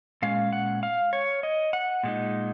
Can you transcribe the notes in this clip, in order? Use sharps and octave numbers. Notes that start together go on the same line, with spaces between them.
A#2 G#3 C#4 F5
F#5
F5
C#5
D#5
F#5
A#2 G#3 D#4